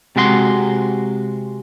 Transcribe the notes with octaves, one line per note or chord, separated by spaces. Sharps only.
C3 G#3 F#4 E5 C6